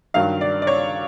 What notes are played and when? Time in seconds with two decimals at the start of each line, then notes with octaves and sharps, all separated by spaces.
0.14 G2 D#3 F#3 F5
0.41 D5
0.62 D5
0.67 C#5